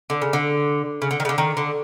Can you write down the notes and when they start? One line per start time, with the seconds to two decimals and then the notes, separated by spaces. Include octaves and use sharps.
0.10 D3
0.22 C#3
0.33 D3
1.02 C#3
1.11 D3
1.20 D#3
1.25 C#3
1.29 D3
1.38 D#3
1.57 D3